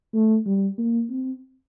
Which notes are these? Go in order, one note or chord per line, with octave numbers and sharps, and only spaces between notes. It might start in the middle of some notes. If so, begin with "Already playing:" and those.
A3
G3
A#3
C4